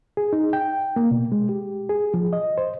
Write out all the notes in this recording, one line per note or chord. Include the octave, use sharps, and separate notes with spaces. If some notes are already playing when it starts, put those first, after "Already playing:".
G#4
D#4
G5
A#3
B2
G#3
G4
G#4
F3
D#5
C5